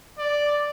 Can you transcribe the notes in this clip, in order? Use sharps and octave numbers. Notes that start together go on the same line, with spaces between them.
D5